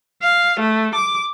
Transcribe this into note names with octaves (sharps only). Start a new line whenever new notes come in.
F5
A3
D6